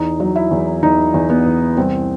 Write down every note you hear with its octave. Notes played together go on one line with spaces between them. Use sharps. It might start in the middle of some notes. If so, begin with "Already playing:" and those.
Already playing: E2 D#4
F#3
E4
E2
E2 D#4
E2
B3
E2
C2 C4